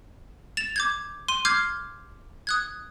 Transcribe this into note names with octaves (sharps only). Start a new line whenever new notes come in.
A6 E7 F7
D6 G6 G#6
C6 D#7
D6 F6 G6 G#6 C7
D#6 F#6 G#6